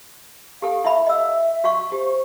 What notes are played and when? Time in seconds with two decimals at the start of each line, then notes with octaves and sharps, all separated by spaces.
0.62 G4 A4 F5
0.84 E4 E5 B5
1.07 D#5 E5 E6
1.64 F#4 F5 C#6
1.92 G4 C5